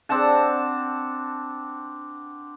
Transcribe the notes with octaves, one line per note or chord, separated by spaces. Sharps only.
C4 D4 F#5 A5